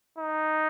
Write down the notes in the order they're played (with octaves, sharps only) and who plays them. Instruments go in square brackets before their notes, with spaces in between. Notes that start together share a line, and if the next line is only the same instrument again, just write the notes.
[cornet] D#4